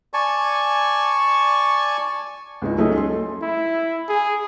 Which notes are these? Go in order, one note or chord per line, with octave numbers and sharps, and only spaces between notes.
D5 G#5 A5 C#6
C#2 G#3 D#4
F#3 A3 C#4 D#4 G#4
C6
A4
E4
G#4